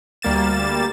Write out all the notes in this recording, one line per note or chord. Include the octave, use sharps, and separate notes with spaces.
D2 G3 A#3 A6 E7